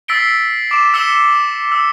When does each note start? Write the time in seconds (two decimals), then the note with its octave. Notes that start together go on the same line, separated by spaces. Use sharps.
0.08 E6 A6 B6 C7 D7 G7
0.71 D6 D7 E7
0.94 E6 B6 C#7 E7 G7
1.72 E6